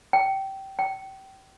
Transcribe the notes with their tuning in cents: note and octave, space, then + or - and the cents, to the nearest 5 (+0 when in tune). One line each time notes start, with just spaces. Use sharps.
G5 -20
G5 -30